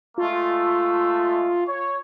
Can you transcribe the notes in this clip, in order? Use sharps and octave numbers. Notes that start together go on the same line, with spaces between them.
G#3 A3 F4
C#5